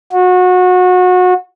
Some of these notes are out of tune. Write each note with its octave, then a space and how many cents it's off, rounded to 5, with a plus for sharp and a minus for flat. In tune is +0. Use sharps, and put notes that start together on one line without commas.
F#4 -25